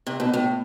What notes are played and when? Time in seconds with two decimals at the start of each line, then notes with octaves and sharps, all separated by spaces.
0.07 C3
0.20 B2
0.34 A2